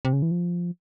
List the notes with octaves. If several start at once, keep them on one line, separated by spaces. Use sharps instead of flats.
C3
C#3
E3
F3